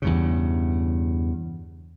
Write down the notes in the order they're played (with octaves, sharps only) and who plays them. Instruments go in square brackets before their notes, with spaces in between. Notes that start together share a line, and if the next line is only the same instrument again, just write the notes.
[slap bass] E2 G2 C#3